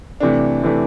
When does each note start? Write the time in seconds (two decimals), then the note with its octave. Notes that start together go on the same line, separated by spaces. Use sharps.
0.20 C3 E3 A3 D4
0.63 C3 E3 A3 D4